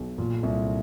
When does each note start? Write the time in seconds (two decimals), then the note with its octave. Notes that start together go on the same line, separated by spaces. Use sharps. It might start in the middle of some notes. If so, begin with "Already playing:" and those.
Already playing: B1
0.18 A#2
0.43 C2